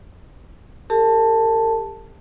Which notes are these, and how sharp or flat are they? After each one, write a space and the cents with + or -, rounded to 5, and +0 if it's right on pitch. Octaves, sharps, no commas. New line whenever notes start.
G4 +35 A#4 -45 A5 +0